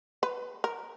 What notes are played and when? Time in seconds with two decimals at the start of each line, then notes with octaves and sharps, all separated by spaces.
0.23 B4
0.64 A#4